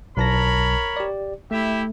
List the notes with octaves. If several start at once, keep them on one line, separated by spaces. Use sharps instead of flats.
B1 A#4 C#5 A5 B5 A#6
G4 D5
A3 E4 G4 E5